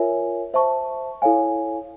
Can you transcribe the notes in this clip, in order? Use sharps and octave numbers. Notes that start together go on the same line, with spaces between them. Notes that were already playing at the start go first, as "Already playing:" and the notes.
Already playing: F4 A#4 C#5 E5 G#5
C5 E5 A5 C#6
E4 A4 C#5 F5 G#5